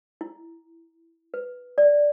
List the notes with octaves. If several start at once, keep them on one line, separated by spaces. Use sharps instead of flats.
E4
B4
D5